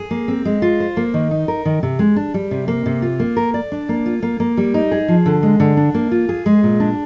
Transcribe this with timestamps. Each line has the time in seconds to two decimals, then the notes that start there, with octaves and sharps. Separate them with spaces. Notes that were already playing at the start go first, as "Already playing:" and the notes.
Already playing: G#4
0.11 A#3
0.28 C4
0.45 G#3
0.62 F4
0.80 C5
0.97 A#3
1.14 D#3
1.31 D#4
1.48 A#4
1.65 D#3
1.83 C3
1.99 G#3
2.16 D4
2.34 G3
2.51 C3
2.68 A#3
2.86 C3
3.02 F4
3.20 A#3
3.37 A#4
3.54 D5
3.72 D4
3.89 A#3
4.06 F4
4.22 A#3
4.40 A#3
4.57 G3
4.74 D#4
4.91 G#4
5.08 F3
5.26 D3
5.43 G#3
5.60 D3
5.77 D4
5.94 A#3
6.12 F4
6.29 G#4
6.46 G#3
6.63 A#2
6.80 D4